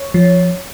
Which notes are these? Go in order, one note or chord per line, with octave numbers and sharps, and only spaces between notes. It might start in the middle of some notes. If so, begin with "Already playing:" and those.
Already playing: C#5
F3